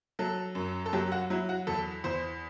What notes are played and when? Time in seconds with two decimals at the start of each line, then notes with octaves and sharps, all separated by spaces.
0.19 F#3 A4
0.55 F#2
0.86 A4
0.93 F#3 G4
1.12 F#4
1.30 F#3 E4
1.49 F#4
1.67 E2 A4
2.04 E2 C5